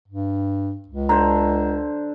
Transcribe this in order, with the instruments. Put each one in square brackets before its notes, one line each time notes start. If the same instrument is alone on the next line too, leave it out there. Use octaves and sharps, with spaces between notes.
[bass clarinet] G2
C#2
[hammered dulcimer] D3 C5 [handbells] A#5